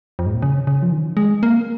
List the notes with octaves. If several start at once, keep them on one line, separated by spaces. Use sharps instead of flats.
F2
G#2
A#2
C#3
C#3
F3
D#3
G#3
A#3